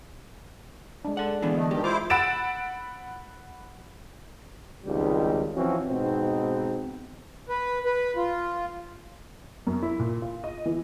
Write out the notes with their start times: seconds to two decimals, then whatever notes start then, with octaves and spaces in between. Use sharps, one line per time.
1.05 G#3 D4
1.17 A4 D5 F#5
1.42 D3 E3 B3 D4
1.58 A3 D#5
1.71 G2 D#3 G#3 G4
1.84 E4 F4 C5 D6
2.10 F#5 B5 E6 A6 D7 E7
4.84 G#1 C#2 D#3 G3 G4
5.54 E3 F3 C4 C#4 F#4
5.88 G#2 B2 B3 C4 D#4
7.49 B4
7.85 B4
8.16 F4
9.67 F#2
9.83 E4
9.99 A#2
10.22 F4
10.44 D#5
10.66 E3